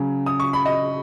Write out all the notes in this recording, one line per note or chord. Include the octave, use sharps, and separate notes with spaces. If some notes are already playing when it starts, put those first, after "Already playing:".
Already playing: C#3 F#3 C#4
D#6
C#6
B5
D#5